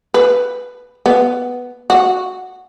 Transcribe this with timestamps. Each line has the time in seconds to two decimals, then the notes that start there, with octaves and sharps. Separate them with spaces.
0.14 B4
1.06 B3
1.90 F#4